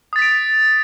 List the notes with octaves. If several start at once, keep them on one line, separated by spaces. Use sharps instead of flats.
D#6 A6 B6 D7